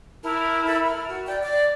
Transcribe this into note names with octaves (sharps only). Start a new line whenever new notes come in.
E4 A#4 A5
E4 A4 E5 B5
A#4
F#4
D5 G5
D5 D6